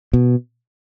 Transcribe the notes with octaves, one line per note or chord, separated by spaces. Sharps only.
B2